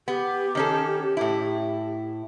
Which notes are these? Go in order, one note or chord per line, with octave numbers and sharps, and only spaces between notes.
B3 G4
D#3 C#4 A4
A2 E4